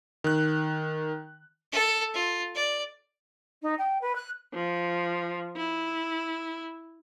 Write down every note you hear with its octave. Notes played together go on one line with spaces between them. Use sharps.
D#3 F#6
A4
F4
D5
D#4
G5
B4
F#6
F3
E4